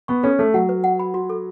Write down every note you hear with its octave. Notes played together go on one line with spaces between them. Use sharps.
B3 C#6
C#4 A4
A3 A4
F#3 F#5
B4
F#5
B5
F#4
A4